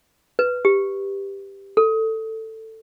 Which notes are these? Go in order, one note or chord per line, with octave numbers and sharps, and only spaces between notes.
B4
G4
A4